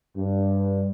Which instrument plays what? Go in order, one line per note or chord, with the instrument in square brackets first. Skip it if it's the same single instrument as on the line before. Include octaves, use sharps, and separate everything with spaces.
[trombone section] G2